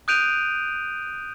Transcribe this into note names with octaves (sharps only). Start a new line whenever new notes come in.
D#6 F#6 G6 D7 D#7 F7